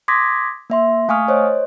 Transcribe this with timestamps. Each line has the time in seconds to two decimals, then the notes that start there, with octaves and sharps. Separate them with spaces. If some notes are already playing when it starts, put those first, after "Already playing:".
0.08 C6 D6 D#6 G#6 A#6 B6
0.70 A#3 E5 C6
1.08 A3 F5 G#5 C#6 D#6 F6
1.28 C5 C#5 D#5